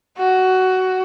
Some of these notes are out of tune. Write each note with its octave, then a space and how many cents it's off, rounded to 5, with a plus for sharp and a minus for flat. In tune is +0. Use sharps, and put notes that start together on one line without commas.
F#4 +15